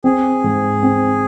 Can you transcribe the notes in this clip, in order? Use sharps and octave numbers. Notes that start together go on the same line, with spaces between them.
C4 G#4
G#2
C4